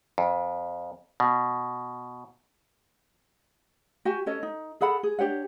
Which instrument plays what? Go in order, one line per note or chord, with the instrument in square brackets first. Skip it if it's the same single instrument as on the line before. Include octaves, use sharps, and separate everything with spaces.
[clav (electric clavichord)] F2
B2
[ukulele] F#4 G4 G#5
C#4 A4 C#5 D#5
D#4
G#4 A4 F#5 B5
G#4
D4 G4 C#5 F#5